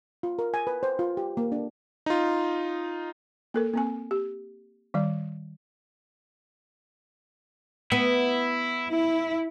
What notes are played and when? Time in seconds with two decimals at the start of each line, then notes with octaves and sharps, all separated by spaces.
0.23 F4
0.39 A#4
0.54 G#5
0.67 B4
0.83 C5
0.99 F4
1.17 G4
1.37 A#3
1.52 D4
2.06 D#4 F4
3.54 A#3 A4 A#4
3.73 A#3 C4 G#5
4.11 G4
4.94 D#3 G3 D5
7.92 B3 E4
8.89 E4